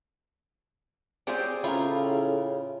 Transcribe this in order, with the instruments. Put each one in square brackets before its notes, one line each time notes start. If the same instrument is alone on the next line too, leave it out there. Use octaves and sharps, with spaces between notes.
[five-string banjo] C4 C#4 D5 [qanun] G4 G#4 C5
[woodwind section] A2 C#3 [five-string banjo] E4 A#4 [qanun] F4